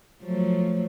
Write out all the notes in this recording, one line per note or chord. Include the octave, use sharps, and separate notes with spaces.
F3 F#3 A3